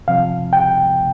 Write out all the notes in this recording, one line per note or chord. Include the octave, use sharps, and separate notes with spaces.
C3 F3 C4 F5
G5